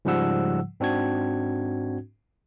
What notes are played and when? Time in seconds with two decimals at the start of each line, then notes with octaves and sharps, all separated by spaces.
0.05 G#2 C#3 F3 G3 F#5 E6
0.80 G#2 C4 D4 F#4 G#6